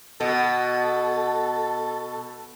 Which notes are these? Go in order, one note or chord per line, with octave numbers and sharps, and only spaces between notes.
B2 A4